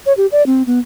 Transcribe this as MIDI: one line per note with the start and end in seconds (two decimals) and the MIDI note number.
0.06 0.13 73
0.17 0.27 67
0.32 0.45 74
0.46 0.63 60
0.67 0.79 59